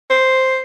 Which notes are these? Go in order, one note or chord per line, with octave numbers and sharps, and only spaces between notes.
C5